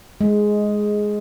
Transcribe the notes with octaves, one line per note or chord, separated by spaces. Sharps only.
G#3